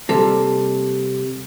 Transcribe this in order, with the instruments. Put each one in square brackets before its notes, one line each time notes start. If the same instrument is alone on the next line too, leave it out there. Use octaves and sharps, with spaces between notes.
[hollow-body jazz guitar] C3 G3 A#3 [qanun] A4